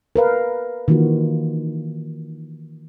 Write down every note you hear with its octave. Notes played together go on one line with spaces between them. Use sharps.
A#4 B4 F5
D#3 E3 A#3 F4 F#4